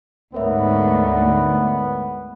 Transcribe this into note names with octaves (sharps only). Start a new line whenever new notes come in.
D2 G#2 D3 B3 A#4 C#5 E5